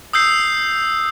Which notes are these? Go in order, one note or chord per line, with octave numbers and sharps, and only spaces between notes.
D#6 E6 G6 C7